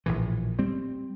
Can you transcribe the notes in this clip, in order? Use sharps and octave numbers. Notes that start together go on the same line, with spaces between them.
A#1 A2 E3
G3 C4